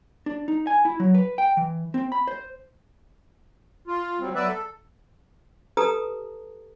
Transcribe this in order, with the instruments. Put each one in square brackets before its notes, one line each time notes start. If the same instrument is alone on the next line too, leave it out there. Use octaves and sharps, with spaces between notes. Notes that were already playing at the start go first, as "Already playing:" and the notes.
[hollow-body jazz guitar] D4
D#4
G#5
E4
F#3
B4
G5
E3
C4
B5
C5
[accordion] F4
F#3 G3 C4
F#3 B3 B4 D5 E5
A4
[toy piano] G4 A4 B4 A5 A#5 D#6